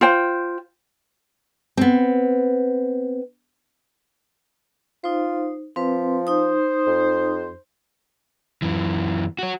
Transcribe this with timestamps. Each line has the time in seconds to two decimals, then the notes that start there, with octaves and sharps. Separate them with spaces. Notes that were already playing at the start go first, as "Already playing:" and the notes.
0.01 F4 C5 G5
1.77 B3 C4
5.04 D#4 F4 C5
5.76 F3 C4 B4
6.27 D#4 C5 D#6
6.86 F2
8.62 F#2 E3
9.39 F#4 C#5